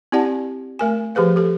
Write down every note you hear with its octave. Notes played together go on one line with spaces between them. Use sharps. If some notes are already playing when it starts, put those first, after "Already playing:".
C4 E4 G4 D5 F#5 A5
A3 A#4 G#5
F3 G4 G#4 B4 F5
G4 A4